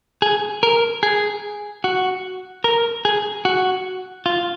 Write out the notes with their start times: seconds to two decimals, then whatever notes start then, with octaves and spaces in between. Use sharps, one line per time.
0.22 G#4
0.63 A#4
1.03 G#4
1.84 F#4
2.64 A#4
3.05 G#4
3.45 F#4
4.26 F4